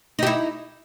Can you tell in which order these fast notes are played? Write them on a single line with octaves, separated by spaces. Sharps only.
D#4 G4 E4